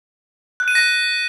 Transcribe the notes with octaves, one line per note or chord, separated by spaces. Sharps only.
F#6
D#7
A#6